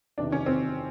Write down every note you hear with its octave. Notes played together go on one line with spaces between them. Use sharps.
E2 C3 D#3 D4
C#4
C4